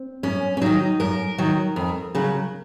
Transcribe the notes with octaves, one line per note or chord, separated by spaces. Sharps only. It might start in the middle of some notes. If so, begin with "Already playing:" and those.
Already playing: C4
F#2 C#4
C#4
D#3 F#3 D#4
F#2 A#4
D#3 F#3
F2
C#3 F#3